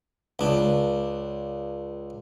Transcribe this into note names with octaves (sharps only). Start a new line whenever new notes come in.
C#2 D4